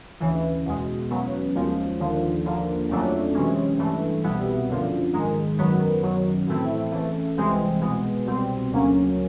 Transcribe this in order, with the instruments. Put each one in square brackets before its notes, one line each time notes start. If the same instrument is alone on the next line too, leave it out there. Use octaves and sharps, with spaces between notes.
[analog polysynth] D2 C#3 E3
E2 B2 G#3
E2 C#3 F#3 B3
D#2 C#3 F3 G#3
D#2 D3 F3
D#2 D3 F3 A#3
F2 C#3 F#3 A3 D4
C3 E3 G#3 C#4
G2 E3 A3
C2 B2 G3 B3 E4
F#2 D3 F3
G#2 D#3 G#3
F#2 D#3 F#3 B3
F#2 D#3 F#3
A2 E3 A3 C4 E4
C#3 E3 A3
C2 C3 E3 G#3 C4
B2 G#3 B3
C2 B2 G3 C4
D2 C#3 F#3 A#3 C#4